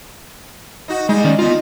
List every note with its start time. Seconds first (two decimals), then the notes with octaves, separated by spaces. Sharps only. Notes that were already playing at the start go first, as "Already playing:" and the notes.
0.88 D#4 F#4
1.09 G3 G#3 D#4
1.24 D#3 C#4 D5
1.39 B3 D#4 F4